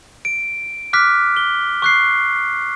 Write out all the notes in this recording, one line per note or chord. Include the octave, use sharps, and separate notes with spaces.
D7
D6 F6 F#6 B6
G7
C#6 F#6 C7